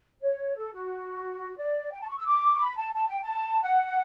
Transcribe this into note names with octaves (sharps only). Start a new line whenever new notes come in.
C#5
A4
F#4
D5
G5
A5
C#6
E6
D6
C#6
B5
A5
A5
G5
A5
F#5